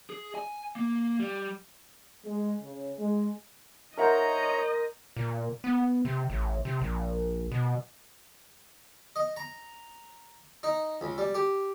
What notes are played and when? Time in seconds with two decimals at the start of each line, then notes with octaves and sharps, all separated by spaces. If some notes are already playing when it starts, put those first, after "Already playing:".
0.10 G#4
0.35 G#5
0.76 A#3
1.19 G3
2.25 G#3
2.61 C#3
2.98 G#3
3.97 D#4 A#4 C5 C#5 D#5 E5 F#5 A#5
5.16 A#2
5.64 B3
6.05 C3
6.30 A1
6.65 C3
6.81 A#1
7.52 B2
9.16 D#5
9.37 A#5
10.63 D#4
11.01 C#2
11.18 G3
11.35 G4